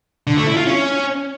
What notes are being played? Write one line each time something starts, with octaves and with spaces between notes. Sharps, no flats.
D3
A3
E4
F4
C#4